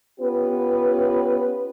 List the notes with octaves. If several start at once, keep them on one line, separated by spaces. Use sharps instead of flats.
B3 C#4 F4 G4 B4